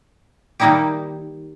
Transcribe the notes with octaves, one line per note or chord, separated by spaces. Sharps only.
D#3 G3 A#3 D#4 E4 G4